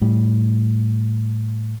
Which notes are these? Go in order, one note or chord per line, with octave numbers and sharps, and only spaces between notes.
A2 G3